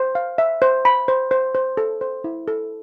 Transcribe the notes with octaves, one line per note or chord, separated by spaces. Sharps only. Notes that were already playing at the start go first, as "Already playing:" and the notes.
Already playing: C5
F5
E5
C5
B5
C5
C5
C5
A4
C5
E4
A4